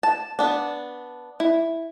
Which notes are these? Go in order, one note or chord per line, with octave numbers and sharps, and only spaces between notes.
A5
B3 D4
E4